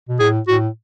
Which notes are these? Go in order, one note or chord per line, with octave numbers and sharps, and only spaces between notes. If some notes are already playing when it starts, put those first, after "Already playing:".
B2
A2 G#4
A2 F#4